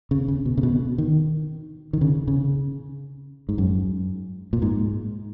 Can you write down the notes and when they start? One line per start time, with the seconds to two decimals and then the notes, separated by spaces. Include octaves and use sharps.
0.11 C#3
0.28 C#3
0.45 B2
0.58 C#3
0.63 B2
0.98 D#3
1.93 D#3
2.01 C#3
2.28 C#3
3.49 G#2
3.58 F#2
4.53 A#2
4.62 G#2